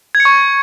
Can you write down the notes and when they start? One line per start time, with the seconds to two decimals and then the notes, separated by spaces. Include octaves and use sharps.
0.15 G#6
0.20 C#7
0.25 C#6